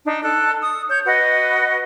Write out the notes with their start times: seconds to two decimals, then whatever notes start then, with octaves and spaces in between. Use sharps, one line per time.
0.04 D4 D#4
0.23 A4 F#6
0.62 D#6
0.89 C#5 G6
1.06 F#4 B4 D#5 F#5